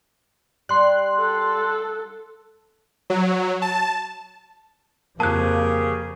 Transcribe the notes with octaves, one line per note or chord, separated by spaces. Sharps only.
G3 C6 F#6
A4
F#3
A5
F2 C#3 F3 A#3 G4 G#4 A5 F#6